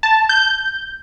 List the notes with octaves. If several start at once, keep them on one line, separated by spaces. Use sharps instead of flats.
A5
G6